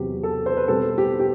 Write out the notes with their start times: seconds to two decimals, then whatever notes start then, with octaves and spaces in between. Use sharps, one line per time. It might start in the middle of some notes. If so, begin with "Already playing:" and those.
Already playing: E2 C3 F#3 C4 G4
0.23 A4
0.46 C5
0.57 B4
0.68 B2 G3 C4 A4
0.98 G4
1.19 G4